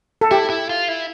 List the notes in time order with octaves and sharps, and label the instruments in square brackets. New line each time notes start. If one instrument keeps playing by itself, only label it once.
[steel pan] A4
[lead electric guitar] E4 [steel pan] G4
[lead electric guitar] E4
F4
E4